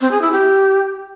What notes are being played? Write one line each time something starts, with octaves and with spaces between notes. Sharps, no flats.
C4
G#4
E4
G4